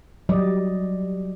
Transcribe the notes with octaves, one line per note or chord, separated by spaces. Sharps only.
F#3 G3 D5 D#5